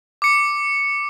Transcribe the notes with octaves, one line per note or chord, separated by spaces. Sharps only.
D6 C#7